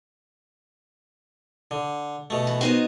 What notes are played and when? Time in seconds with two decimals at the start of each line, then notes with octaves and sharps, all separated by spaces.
1.71 D3
2.30 B2 A3
2.47 E3
2.61 B3 D#4 F#4 C5